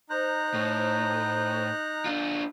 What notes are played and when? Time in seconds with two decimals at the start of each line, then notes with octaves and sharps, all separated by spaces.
0.10 D#4 C5 A#5 F#6 G6
0.54 A2
2.06 D4 F4